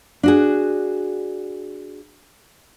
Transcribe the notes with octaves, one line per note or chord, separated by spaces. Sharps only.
D4 F#4 G#4